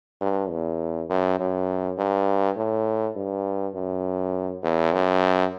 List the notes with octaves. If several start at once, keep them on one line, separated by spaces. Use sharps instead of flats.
G2
E2
F#2
F#2
G2
A2
G2
F#2
E2
F#2